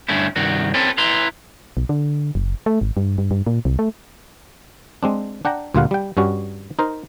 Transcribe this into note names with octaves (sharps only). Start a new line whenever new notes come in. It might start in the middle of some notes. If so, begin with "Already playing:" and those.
G2 D3 A3 C#4 E4
C2 G2 D#3 F#4
C4 C#4 A4 B4
E4 B4 A#5 C6
B1
D3
F#1
A3
G#1
G2
G2
G2
A#2
C2
A3
G#3 C4 D4
D4 F#5 G5 A#5
D2 A#2 G3 F4 F5 F#5
G3 G5
G2 G3 C#4 F#4
D#4 A#4 C5